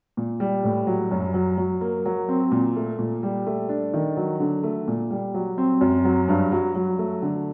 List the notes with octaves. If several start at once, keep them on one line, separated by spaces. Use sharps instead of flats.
A#2
G3
A2
F#3
F#2
F#3
F#3
A#3
F#3
C4
A#2
A3
A#2
G3
A3
D4
D#3
F#3
D3
A3
A#2
G3
F#3
C4
F#2
F#3
G2
F#3
F#3
A3
D3